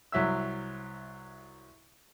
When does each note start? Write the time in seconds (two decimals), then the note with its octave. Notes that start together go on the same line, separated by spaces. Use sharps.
0.12 C2 F#3 E5 E6